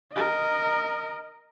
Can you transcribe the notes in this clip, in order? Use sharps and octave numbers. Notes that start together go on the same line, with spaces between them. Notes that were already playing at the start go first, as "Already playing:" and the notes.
A#4 D#5